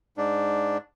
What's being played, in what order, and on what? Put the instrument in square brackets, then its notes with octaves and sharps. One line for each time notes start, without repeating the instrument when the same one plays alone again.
[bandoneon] G#2 D4